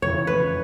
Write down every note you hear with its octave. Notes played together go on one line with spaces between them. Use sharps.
F2 C#3 E3 C#5
B4